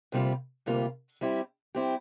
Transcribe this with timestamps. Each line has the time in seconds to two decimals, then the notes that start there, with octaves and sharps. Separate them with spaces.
0.12 D2 C3 G3 A#3 F4
0.66 D2 C3 G3 A#3 F4
1.21 G3 C4 E4 G4
1.75 G3 C4 E4 G4